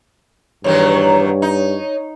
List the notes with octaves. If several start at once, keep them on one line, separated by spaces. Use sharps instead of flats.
E2 G2 D#3 F#3 C#5
D#4